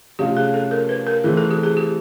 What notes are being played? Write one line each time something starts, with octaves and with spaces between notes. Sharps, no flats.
C3 F3 A3 C#4 F4 G4
G#4
A4
A#4
B4
A#4
E3 A3 C4 G#4
A4
G4
G#4
G4